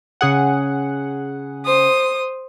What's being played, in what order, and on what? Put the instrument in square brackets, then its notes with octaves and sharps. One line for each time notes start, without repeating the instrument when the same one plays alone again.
[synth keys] C#3 G#4 F#5
[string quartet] C5 D#6